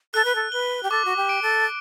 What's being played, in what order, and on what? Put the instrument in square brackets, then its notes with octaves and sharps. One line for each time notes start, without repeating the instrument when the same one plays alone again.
[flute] A4 [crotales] F#6
[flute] B4
A4
[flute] B4 [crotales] G7
[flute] G4
[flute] A4 [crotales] D6
[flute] F#4
G4
[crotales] D7
[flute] A4